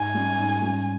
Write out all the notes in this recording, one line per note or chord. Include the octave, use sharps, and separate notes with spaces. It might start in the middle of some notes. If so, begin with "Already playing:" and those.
Already playing: G#2 G#5
G3 C#4
G#2
G3 C#4